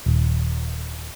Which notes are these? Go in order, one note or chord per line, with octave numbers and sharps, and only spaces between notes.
D#1